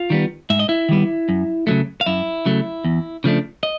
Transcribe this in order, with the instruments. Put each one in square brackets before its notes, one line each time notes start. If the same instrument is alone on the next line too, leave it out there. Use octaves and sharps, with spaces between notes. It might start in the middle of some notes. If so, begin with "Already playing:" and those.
Already playing: [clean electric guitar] F4 F5
D#3 G3 B3
G#2 E5
D#5
E4 E5
D#3 G3 B3
F#2
C#3 F#3 A3
F5
F#2 E4 E5
C#3 F#3 A3
E2
C#3 F3 A3 D4
D#5